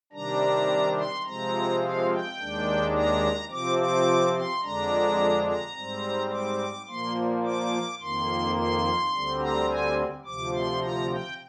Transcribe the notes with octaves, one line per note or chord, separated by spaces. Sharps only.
C3 D#3 G3 D4 A#5
C6
C3 F3 G#3 C4 A#5
F5
G5
D#2 D#3 G#3 D4
A#5
C3 F3 C4 D6
D6
C6
F2 D3 G#3 D4 A#5
A#5
G#2 G3 C4
D6
A#2 F3 A#3 C6
D6
F2 D#3 A#3 C6
C6
D2 D3 G3 C4
A#5
G#5
D2 C3 F3 D6
C6
A#5
G5